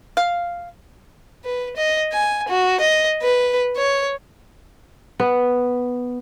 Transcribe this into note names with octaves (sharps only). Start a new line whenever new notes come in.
F5
B4
D#5
G#5
F#4
D#5
B4
C#5
B3